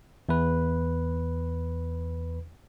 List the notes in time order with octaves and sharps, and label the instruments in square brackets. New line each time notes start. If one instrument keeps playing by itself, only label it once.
[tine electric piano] E2 B4